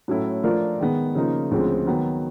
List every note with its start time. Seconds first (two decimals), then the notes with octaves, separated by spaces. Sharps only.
0.08 A2 F#3 A3 C#4 E4
0.43 F3 A3 D4 F4 A#4
0.80 D#3 G#3 B3
1.15 C#3 F3 A#3 D#4
1.51 D2 C#3 F3 G#3 C4
1.87 D#3 F#3 B3